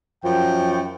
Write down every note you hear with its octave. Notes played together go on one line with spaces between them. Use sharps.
F#2 F3 G5